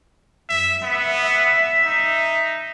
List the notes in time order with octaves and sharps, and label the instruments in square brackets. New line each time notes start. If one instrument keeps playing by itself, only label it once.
[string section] F#2 [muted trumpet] E5
[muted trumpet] B3 [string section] E5
[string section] E5
[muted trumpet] D#4